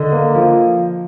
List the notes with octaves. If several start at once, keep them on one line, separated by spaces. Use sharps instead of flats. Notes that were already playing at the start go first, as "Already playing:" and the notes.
Already playing: D3 D#5
A#3
F3